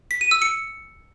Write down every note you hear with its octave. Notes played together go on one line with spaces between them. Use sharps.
B6
D#7
E6
C#7